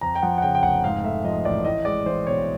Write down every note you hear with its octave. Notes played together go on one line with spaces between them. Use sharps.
F2 A#5
G5
F3 F#5
F#5
C#3 G5
G5
F1 F#5
G#2 F5
A3 E5
F3 D#5
A1 D5
A2 D#5
G#3 D5
E3 C5
B1 C#5